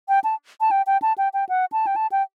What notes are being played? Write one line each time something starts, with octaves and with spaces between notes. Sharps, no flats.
G5
A5
A5
G5
G5
A5
G5
G5
F#5
A5
G5
A5
G5